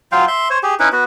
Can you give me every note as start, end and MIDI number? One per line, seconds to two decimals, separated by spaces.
0.12 0.25 54
0.12 0.25 65
0.12 0.25 77
0.12 0.25 79
0.28 0.48 76
0.28 0.48 84
0.50 0.59 72
0.50 0.59 73
0.63 0.74 67
0.63 0.74 68
0.80 0.89 61
0.80 0.89 63
0.80 0.89 64
0.80 0.89 71
0.92 1.04 59
0.92 1.04 66